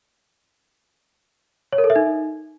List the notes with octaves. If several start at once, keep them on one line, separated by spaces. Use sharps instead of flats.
C#5
A#4
A4
E5
D#4